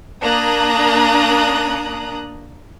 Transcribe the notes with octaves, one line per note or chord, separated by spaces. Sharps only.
A#3 D4 A#5 D#6 F#6